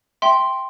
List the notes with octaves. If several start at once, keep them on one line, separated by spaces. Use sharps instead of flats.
E5 G5 C6